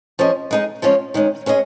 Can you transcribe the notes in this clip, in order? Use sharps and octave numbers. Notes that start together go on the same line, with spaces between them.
F3 C#4 G#4 D#5
G#3 D#4 G#4
F3 G#3 C#4 F4 C#5
D#3 G#3 C#4
G#3 C#4 G#4 D#5